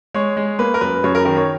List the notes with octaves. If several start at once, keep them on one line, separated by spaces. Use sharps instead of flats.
G#3 C#5
G#3
A#3 B4
A#4
F#2 B4
F#2 C#5
A#4
D#3 A#4
C#5